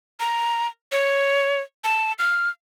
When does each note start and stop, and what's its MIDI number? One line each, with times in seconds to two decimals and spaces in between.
0.20 0.67 82
0.92 1.60 73
1.84 2.13 81
2.19 2.49 89